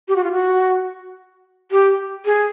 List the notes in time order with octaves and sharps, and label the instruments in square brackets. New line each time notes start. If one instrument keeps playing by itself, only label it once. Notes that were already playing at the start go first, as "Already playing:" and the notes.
[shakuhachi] G4
F#4
F4
F#4
G4
G#4